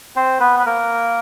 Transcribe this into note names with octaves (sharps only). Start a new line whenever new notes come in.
C4 C5
B3 B4
B4
A#3 A#4